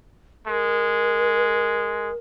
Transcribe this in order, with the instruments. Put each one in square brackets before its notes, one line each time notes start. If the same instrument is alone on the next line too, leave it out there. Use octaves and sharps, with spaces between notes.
[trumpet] G#3 [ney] A#4